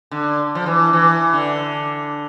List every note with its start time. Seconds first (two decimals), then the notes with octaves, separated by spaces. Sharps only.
0.11 D3
0.55 F3
0.66 E3
0.93 E3
1.33 D3